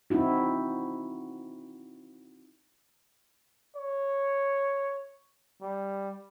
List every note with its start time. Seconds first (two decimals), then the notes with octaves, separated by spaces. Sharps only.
0.10 C4 D#4 E4 F#4
3.76 C#5
5.62 G3